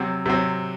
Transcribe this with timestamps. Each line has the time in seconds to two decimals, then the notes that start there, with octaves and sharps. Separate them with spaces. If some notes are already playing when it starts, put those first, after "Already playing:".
Already playing: C3 F#3 C4
0.26 C3 F#3 C4